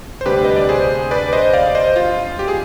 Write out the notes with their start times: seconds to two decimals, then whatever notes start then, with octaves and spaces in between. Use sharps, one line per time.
0.21 C5
0.26 D2 C3 G3 D4 G4 B4
0.45 D#5
0.56 D5
0.69 G#4 C5
1.11 B4 D5
1.33 C5 D#5
1.53 D5 F5
1.75 C5 D#5
1.96 F4
2.39 G4
2.48 G#4